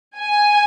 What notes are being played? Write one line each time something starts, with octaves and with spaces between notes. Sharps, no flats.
G#5